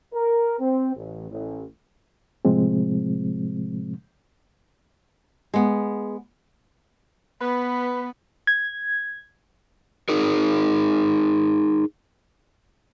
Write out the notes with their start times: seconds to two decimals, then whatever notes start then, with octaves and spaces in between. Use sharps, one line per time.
0.14 A#4
0.59 C4
0.95 A1
1.30 A1
2.45 A2 C3 F3 G#3 C4
5.54 G#3 B3
7.41 B3 B4
8.47 G#6
10.09 D#4 G#4 A#4